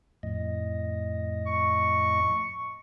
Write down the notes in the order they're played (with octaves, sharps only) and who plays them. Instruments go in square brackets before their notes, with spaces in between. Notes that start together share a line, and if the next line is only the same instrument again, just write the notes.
[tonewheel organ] F2 A2 D#5
[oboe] C#6